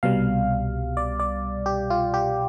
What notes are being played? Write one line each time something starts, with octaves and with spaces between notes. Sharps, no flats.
C2 B2 G3 F5
D5
D5
G4
F4
G4